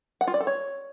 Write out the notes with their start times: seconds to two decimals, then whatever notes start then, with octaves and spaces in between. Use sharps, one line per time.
0.21 F#5
0.27 F4
0.34 D5
0.40 A4
0.47 C#5